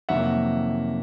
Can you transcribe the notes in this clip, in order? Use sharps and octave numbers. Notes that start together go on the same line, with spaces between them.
F2 C3 D#3 F#3 A#3 E5 F#5